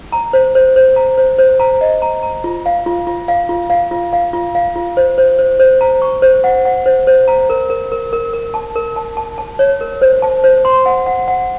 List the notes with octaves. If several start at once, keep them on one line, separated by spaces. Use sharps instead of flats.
A#5
C5
C5
C5
A#5
C5
C5
A#5
D#5
A#5
A#5
F4
F5
F4
F4
F5
F4
F5
F4
F5
F4
F5
F4
C5
C5
C5
C5
A#5
C#6
C5
F#5
F#5
C5
C5
A#5
A#4
A#4
A#4
A#4
A#4
A5
A#4
A5
A5
A5
C#5
A#4
C5
A5
C5
C6
F#5
F#5
F#5